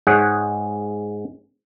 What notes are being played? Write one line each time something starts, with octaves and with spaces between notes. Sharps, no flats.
G#2 G#4 C#5 F#5